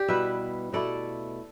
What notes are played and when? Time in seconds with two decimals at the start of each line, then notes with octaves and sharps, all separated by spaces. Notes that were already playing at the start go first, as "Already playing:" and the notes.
Already playing: G4 D5
0.08 B2 G3 E4 B4 E5
0.73 B2 A3 E4 A4 D5